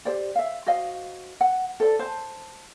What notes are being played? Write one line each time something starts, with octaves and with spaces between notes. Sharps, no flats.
G4 C5 D5
E5 F5
F#4 C5 D#5 F5
F#5
A4 C5 D5
C5 A5